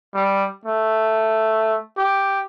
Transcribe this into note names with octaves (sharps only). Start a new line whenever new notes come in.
G3
A3
G4